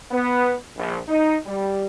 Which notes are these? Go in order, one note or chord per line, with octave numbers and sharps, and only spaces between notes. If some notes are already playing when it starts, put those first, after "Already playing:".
B3
A#1
D#4
G3